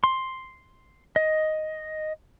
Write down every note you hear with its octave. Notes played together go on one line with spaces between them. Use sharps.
C6
D#5